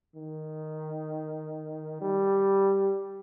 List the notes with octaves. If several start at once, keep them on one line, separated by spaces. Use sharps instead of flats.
D#3
G3